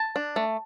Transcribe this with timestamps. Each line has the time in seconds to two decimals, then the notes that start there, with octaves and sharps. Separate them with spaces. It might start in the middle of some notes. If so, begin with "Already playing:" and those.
Already playing: A5
0.16 D4
0.36 A3